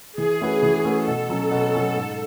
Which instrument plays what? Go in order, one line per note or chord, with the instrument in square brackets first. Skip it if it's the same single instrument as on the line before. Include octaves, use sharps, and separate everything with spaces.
[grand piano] E3 [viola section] G#4
[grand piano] A3 C#4 F#4 B4
E3
A3 C#4 F#4 B4
[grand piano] B2 [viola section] A4
[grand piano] F#3 C#4
B2
F#3 C#4
G#2